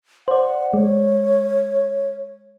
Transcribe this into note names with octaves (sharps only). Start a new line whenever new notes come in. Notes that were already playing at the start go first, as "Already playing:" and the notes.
C5 D5 F#5
G#3 C#5